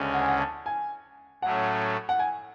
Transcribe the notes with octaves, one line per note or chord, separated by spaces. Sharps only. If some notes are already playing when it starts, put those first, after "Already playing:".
Already playing: D2 C#3 G#3 C#4
F#5
G#5
F#5
A5
G#5
A2 F#3 A3 C#4 F#5
F#5
G#5